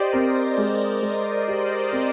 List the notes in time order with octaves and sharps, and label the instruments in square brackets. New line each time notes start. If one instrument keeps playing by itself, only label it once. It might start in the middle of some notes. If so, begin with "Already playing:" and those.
Already playing: [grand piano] G4 [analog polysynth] C5 D5 D#5
[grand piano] C4 [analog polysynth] A#4
[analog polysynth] A#4
C5
[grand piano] G#3 [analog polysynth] C5
[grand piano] G#3
G4
C4